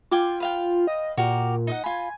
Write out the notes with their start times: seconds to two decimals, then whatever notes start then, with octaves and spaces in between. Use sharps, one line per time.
0.11 F4 G5 G#5 D6
0.40 B4 F5 G5
0.87 D#5
1.18 A#2 F#4 G4 A#4
1.67 D#4 D#5 F#5
1.84 F4 G#5 B5